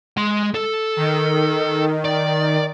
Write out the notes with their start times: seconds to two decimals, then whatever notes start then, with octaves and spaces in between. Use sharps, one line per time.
0.17 G#3 C6
0.54 A4
0.97 D#3
2.05 D5